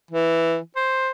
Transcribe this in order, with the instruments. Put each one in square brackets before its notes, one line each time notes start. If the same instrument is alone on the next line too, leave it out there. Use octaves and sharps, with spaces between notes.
[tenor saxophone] E3
C5